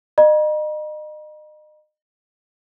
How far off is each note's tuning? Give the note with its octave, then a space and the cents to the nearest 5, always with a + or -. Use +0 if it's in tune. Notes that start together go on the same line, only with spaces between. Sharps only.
D#5 -35 A#5 +45